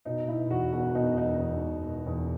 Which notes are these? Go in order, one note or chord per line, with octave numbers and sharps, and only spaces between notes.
B2 D#4
B2 E4
E2 F#4
E1 F#4
B2 D#4
E2 D#4
E2
E1
E1
E2